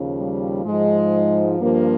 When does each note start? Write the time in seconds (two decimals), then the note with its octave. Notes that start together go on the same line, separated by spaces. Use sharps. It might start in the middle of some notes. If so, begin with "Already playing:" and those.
Already playing: D#2 C#3 F3
0.18 G3
0.65 G#2 F3 G#3
1.59 G2 F3 A#3